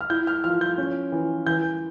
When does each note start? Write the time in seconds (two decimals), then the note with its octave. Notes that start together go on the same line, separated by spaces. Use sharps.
0.01 F6
0.10 E4 G6
0.27 F6
0.44 F3 F6
0.61 G6
0.78 C#4
1.12 E3
1.46 E3 G6